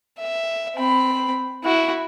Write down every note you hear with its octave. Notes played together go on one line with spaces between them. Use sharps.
E5
C4 B5
E4 F#4